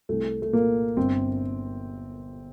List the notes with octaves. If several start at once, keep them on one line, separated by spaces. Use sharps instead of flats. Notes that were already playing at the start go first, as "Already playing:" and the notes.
C2 A3
A3
A#2 A#3
G1 C4